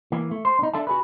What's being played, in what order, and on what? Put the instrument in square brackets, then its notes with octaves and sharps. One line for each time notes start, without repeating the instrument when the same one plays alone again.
[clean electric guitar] E3 A#3
A3
C5
D4 D#4
D4 A4 E5 A5
F#4 G#4 B4